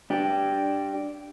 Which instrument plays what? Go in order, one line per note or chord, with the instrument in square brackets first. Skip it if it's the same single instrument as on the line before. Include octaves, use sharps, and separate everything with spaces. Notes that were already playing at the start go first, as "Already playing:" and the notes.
[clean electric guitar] D4 G4